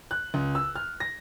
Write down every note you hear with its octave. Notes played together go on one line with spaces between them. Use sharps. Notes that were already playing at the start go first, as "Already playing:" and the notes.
F#6
C#2
E6
F6
A#6